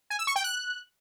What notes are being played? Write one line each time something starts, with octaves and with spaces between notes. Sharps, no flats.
G#5
E6
C#6
G5
F#6